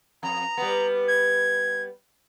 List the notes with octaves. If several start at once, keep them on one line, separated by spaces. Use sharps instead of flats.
F2 A#5
G3 B3
G#6